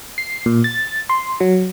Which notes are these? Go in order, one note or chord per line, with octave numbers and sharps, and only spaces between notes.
C7
A#2
A6
C6
F#3